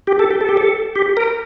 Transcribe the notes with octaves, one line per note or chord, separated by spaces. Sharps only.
G4
A4
G4
A4
G4
A4
G4
A#4